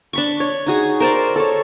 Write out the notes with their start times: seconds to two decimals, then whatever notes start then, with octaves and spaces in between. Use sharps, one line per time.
0.13 D4 B5 C#6
0.40 C#5
0.67 D#4 F#4 G#4
1.00 A#4 C5 D5
1.36 A4 C#5